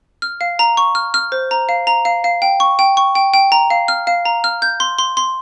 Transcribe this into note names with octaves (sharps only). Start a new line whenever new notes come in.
F6
F5
A#5
C#6
F6
F6
C5
A#5
F5
A#5
F5
F5
G5
C#6
G5
C#6
G5
G5
A#5
F5
F6
F5
A#5
F6
G6
C6
C6
C6